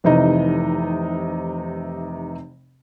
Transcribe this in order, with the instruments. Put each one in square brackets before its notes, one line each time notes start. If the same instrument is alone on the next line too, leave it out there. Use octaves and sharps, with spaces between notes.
[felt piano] F1 C3 E3 D#4 D#5